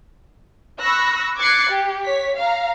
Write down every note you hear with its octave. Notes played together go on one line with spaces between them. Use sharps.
B5 C#6 E6 F#6 A#6
D6 F#6 G#6 A6 C7 C#7
G4
C#5 B6
F5 A#5